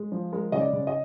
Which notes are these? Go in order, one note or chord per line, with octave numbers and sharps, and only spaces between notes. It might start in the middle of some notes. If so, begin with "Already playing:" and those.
Already playing: G#3
F3
G#3 A#4
C#3 D#5
D5
C#3
D#5